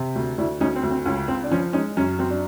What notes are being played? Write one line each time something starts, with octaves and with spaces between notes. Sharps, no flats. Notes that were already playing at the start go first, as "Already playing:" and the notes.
Already playing: C3
D2
D2 D4 E4
D2 C#4 D#4
C4
D2
C4
C#2 C#4
C#2 C4
D4
F3 C#4
G#3 C#4 D#4
F#2 C#4
F#2 C4
D4